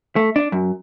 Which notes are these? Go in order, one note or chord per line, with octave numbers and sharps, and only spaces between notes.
A3
D4
F#2